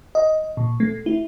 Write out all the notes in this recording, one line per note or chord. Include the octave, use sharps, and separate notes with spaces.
D#5
A#2
A3
E4